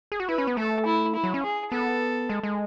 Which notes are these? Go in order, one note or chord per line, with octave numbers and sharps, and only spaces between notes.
G#4
F#4
E4 B4
C#4
B3
A3 A4
E4
E4
F#3
C#4
G#4
B3 A4
G#3
G#3